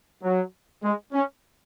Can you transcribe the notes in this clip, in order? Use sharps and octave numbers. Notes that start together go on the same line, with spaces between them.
F#3
G#3
C#4